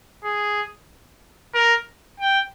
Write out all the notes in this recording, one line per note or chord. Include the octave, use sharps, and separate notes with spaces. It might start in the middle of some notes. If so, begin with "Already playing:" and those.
G#4
A#4
G5